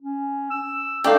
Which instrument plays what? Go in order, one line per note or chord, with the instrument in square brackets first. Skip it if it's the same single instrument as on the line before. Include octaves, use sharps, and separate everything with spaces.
[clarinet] C#4
E6
[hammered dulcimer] A3 D4 D#4 [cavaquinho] G4 [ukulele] D5 F5